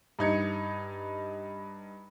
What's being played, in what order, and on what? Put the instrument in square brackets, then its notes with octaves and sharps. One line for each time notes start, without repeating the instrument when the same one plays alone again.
[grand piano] G2 D#4 G#6 C#7